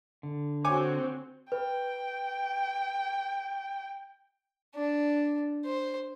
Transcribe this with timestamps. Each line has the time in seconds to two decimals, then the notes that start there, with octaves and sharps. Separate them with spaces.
0.23 D3
0.65 C4 F#4 C#5 G#5 D6
1.52 B4 G5
4.75 D4
5.65 C5